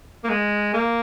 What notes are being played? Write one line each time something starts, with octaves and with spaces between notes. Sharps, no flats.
A#3
G#3
A#3